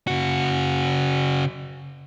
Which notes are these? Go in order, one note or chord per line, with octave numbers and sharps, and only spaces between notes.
C#3 F#4